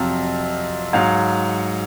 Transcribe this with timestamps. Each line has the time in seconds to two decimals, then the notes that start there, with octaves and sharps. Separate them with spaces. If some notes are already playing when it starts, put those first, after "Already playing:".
Already playing: F2 C3 F#3 F5
0.93 G#2 F#3 F5